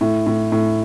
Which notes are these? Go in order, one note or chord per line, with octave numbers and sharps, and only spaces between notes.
A2
A2
A2